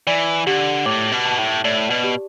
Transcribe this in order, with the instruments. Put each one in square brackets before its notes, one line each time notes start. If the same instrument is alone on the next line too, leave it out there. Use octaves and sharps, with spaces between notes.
[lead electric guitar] E3 [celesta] D5
[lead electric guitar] D3 [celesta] G4
[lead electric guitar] A2 [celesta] D6
[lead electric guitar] B2
[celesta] A5
[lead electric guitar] A2
[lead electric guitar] A2 [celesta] D5
[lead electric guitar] B2
[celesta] G4